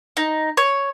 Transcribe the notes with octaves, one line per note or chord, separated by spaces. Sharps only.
D#4
C#5